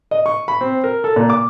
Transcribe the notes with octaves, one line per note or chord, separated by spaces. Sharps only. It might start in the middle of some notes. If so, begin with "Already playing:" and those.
D#5
C#6
B5
C4
A#4
A4
A#2
D6